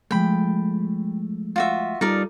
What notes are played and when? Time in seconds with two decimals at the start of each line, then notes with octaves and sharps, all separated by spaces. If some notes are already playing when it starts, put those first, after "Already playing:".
0.11 F3 G#3 A3 G5 B5
1.56 F4 F#4 E5
2.01 G3 D#4 F4 A4 A#4 D5